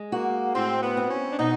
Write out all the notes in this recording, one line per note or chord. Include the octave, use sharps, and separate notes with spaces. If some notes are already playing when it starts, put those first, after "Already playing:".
Already playing: G#3
A#3 F#4
A2 C4
B3
C4
C#4
D4
B2 D#4